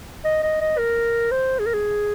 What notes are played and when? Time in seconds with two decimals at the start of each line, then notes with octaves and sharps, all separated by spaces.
0.24 D#5
0.42 D#5
0.60 D#5
0.78 A#4
1.31 C5
1.59 G#4
1.66 A#4
1.74 G#4